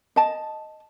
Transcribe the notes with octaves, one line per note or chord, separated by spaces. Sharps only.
D#5 A5